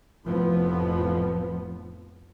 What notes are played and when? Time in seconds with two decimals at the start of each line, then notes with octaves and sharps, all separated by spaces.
0.25 F1 F2 A2 F3 B3